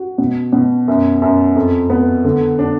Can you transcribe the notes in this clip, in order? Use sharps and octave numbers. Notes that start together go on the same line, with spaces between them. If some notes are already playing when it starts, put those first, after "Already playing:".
Already playing: F#4
B2
B2
F#2
F#2
F2
B3
D3
D4